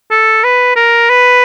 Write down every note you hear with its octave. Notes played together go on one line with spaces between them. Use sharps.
A4
B4
A#4
B4